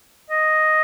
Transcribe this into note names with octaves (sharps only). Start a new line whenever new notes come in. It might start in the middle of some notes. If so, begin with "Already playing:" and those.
D#5